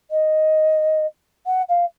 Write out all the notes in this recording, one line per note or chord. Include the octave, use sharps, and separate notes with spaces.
D#5
F#5
F5